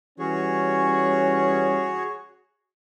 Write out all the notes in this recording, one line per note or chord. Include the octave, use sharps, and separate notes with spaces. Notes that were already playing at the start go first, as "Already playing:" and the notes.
E3 G3 C#4 F#4 G#4 C#5